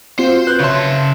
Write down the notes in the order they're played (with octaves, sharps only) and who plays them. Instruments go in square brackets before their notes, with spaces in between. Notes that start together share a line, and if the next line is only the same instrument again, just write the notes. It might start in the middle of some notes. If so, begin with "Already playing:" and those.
[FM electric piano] C4 F4 F#4 [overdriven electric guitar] C5
[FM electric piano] B4 [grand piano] F#6 G6
[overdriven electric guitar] C#3 A5 [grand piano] C#5 E5 C6